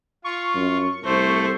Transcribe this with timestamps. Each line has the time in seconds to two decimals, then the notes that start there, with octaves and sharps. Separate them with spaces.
0.24 F4 C#6
0.55 F#2
1.04 C2 A3 C5